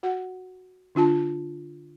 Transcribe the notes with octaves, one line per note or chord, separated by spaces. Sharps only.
F#4 F#5
D3 D4 F4 A5